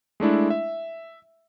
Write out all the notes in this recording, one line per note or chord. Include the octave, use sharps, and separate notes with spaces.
G#3 A3 D4 E4
E5